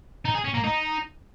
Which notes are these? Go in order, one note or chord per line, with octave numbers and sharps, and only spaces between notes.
D#4
G#4
C#4
A#3
D#4